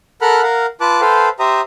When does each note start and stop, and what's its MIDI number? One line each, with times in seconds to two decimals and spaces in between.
0.21 0.42 69
0.21 0.42 70
0.21 0.42 78
0.21 0.42 83
0.21 0.42 89
0.21 0.42 90
0.42 0.66 70
0.42 0.66 77
0.42 0.66 78
0.81 1.01 65
0.81 1.01 71
0.81 1.01 81
0.81 1.01 86
0.81 1.01 90
1.01 1.29 69
1.01 1.29 71
1.01 1.29 72
1.01 1.29 77
1.01 1.29 79
1.39 1.61 67
1.39 1.61 72
1.39 1.61 76
1.39 1.61 82
1.39 1.61 87